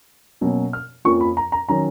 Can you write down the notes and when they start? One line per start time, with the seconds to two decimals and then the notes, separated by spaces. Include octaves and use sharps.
0.41 B2 F#3 A#3 C#4
0.73 F6
1.05 F2 F3 A#3 C#4 C#6
1.21 B5
1.37 A#5
1.52 A#5
1.69 D#3 F#3 C#4 A#5